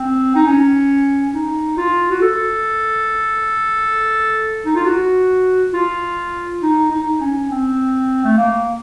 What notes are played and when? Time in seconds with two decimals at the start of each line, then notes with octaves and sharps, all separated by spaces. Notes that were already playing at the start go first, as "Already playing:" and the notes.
Already playing: C4
0.35 D#4
0.47 C#4
1.35 D#4
1.78 F4
2.11 F#4
2.22 A4
4.66 D#4
4.76 F4
4.86 F#4
5.74 F4
6.63 D#4
6.91 D#4
7.21 C#4
7.51 C4
8.25 A3
8.38 A#3